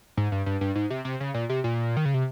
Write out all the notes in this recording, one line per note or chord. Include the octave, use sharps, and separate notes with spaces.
G#2
G2
G2
G2
G#2
C3
C3
C#3
A#2
C3
A#2
D#3
C#3
C3